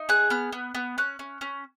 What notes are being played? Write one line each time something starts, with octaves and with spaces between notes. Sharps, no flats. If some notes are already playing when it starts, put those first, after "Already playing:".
Already playing: D#4
G#4 F#6
B3 F6
B3
B3
C#4 F#6
C#4
C#4